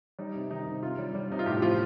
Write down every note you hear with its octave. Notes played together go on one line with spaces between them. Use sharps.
G3 D#4
C3
D#3 D#4
C3
C3 F4
G3
G3
C3 D#4
F4
A2 G4
F3 F4